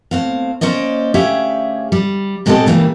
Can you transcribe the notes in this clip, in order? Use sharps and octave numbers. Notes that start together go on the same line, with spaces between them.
A2 C4 F5
A#3 C#4 C5 D5 D#5
D2 C#4 G4 G#4 E5 F5
G3
A#2 G#3 C4 G4 A4 D#5
A#2 C#3 E3 G3 G#3 A#3